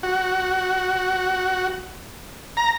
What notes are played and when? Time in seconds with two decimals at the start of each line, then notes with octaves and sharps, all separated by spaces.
0.03 F#4
2.57 A#5